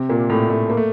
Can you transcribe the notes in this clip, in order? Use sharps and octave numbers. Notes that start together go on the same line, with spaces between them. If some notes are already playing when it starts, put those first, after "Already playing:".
Already playing: C3 C4
A#2 A#3
A2 A3
A2 A3
A#3
A3